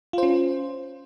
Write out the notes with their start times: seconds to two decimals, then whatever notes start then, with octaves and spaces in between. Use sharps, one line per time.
0.13 F4
0.18 C5
0.23 C#4